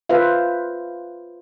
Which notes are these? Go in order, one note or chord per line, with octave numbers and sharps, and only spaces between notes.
F4 B4 C5 E5 F5